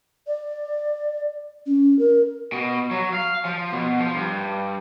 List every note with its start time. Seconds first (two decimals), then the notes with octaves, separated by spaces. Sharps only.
0.27 D5
1.66 C#4
1.99 A#4
2.52 B2
2.91 F#3
3.13 F5
3.45 F3
3.72 B2
3.99 F3
4.14 G2